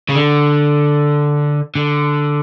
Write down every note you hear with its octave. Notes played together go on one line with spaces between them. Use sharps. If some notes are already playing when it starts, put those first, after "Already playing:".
C#3
D3
D3